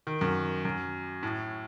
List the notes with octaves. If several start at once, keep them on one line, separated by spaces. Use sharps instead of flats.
D#3
F#2
F#2
A2